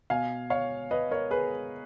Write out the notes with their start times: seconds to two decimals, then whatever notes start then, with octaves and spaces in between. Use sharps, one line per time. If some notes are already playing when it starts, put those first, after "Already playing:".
0.10 B2 F5 G#5
0.50 C#5 F5
0.91 B4 D#5
1.11 A#4 C#5
1.31 G#4 B4